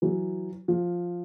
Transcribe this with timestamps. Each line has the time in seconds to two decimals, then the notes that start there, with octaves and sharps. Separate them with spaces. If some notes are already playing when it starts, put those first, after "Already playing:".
0.02 E3 F#3
0.68 F3